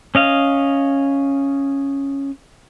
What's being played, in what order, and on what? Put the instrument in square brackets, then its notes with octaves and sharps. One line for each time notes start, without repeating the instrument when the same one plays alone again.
[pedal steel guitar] C#4 D#5 F5